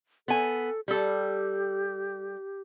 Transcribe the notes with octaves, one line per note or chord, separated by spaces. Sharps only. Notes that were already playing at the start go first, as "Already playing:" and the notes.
B3 A4 G#5
G3 G4 A4